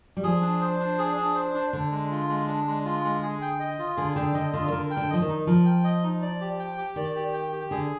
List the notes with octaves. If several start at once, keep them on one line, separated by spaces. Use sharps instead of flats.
G3
F3 G#4
D4
C5
D4
G#4
D4
C5
D4
D3 D4
G#3
F4
G#3
D4
G#3
F4
G#3
G#4
G5
D#5
F4
D3 G#4
D3 G5
D3 D#5
D3 F4
D#3
D3 A#4
G5
D3
F3 D#5
D#3
D#4
F3 A#4
G5
D#5
D#4
D5
G4
G5
G4
D#3 D5
G4
G5
G4
D3 G#4